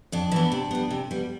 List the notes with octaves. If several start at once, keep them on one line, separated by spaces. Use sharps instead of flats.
F2 D4
E3 B3
C3
G3 B3
C3
G3 B3